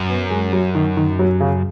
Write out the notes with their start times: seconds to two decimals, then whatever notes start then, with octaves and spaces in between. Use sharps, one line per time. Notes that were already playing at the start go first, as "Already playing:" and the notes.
Already playing: F#2
0.09 B3
0.30 G#3
0.53 F#3
0.75 D#3
0.97 D#3
1.19 F#3
1.40 C#3